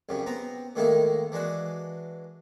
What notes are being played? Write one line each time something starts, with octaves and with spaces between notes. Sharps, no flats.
C2 F#2 C#3 G3
B3 C4 A#5
A2 D#3 G#3 A#3 D#4 E4
E3 G#3 D4 F#4